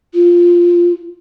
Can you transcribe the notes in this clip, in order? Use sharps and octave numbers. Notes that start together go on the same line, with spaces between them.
F4